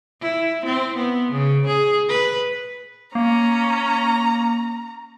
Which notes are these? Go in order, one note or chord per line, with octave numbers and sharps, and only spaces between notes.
E4
C4
B3
C#3
G#4
B4
A#3 C#4 A#5